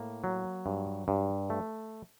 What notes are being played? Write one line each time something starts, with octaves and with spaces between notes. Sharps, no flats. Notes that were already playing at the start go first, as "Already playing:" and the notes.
Already playing: A2 A#3
F#3
G2
G2
A3